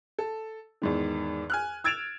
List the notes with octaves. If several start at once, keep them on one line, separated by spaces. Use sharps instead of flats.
A4
E2 G#2 D#3
G#5 F6 F#6
E6 G#6 A6 D7 E7 F7